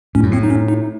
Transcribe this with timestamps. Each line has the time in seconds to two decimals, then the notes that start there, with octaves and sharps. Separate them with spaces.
0.15 A2 C#4
0.23 F#2
0.31 A2 C4
0.43 D#4
0.50 C#4
0.68 D#4